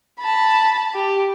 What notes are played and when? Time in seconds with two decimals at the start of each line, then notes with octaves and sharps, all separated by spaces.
0.20 A5 B5
0.95 G4